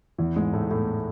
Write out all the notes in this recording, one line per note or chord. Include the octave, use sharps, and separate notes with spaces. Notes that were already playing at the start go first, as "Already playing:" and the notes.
E2 E3
G#2 G#3
A2 A3
A2 A3